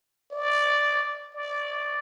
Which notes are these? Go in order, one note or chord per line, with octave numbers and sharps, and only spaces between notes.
D5
D5